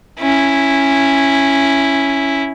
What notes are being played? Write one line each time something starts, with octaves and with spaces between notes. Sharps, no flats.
C#4 E4